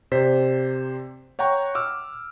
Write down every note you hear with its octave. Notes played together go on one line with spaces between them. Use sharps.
C3 C5 D5 B6
C#5 F#5 G5 A#5 C#6
D6 E6 F6